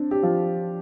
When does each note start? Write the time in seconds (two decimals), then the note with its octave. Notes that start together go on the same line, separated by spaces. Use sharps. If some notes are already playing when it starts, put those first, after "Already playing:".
Already playing: C4 D4
0.11 G4
0.23 F3 F4